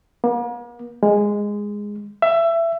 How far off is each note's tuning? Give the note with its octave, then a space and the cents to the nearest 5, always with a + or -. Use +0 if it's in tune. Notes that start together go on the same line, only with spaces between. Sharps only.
A#3 +45
G#3 -10
E5 +20